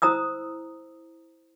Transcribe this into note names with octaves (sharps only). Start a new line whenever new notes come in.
E4 C5 A#5 D#6 E6